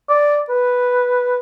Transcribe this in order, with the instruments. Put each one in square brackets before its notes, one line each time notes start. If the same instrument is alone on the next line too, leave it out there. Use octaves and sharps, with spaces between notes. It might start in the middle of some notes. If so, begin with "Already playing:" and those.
[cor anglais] D5
B4